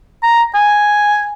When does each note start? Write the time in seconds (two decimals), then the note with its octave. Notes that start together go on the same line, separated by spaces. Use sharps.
0.23 A#5
0.54 G#5